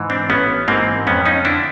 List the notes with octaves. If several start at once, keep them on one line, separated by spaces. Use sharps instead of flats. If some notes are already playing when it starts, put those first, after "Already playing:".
Already playing: G#2 E3
C4 D4
A1 B3 C#4
G#2 E3 A#3 C4
F2 B3 C#4
C#4 D#4
D3 D4 E4